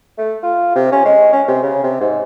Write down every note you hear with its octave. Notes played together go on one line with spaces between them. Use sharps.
A3
F4
C3
C#4
G#3
C#4
C3
C#3
C3
G#2